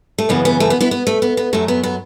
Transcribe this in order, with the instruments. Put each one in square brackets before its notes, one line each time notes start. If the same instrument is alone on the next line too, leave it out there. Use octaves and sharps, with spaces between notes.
[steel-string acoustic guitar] A3
F#2 C#3 E3 B3
B3
A3
B3
B3 E4
B3
A3
B3
B3
F#2 F#3 A3
B3
B3